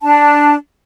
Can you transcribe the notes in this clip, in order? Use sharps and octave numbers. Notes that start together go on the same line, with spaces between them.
D4 A5